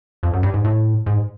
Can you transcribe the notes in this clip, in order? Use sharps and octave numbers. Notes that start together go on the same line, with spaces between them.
F2
F#2
G2
G#2
A2
G#2